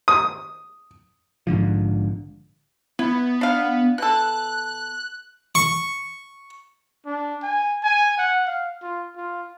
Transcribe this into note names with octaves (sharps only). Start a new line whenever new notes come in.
D#6
A#1 G#2 D3 F3
B3 E4
D4 F5
B2 A4 F#6
C#6
D4
G#5
G#5
F#5
F5
F4
F4